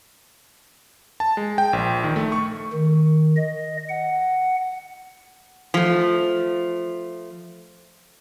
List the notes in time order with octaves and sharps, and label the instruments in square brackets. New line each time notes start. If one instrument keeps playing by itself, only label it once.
[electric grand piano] A5
G#3
G5
A#1
D#3
A3
C#6
[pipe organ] D#3
D#5
F#5
[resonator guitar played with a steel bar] F3 A3